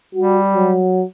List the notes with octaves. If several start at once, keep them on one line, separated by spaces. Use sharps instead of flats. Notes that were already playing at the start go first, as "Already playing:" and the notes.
G3 F#4
F#3